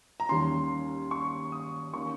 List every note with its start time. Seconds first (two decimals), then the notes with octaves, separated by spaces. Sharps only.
0.20 A#5
0.29 D#2 D#3 G3 C#4 C6
1.11 C#6
1.52 D#6
1.94 D#3 A#3 C#4 C#6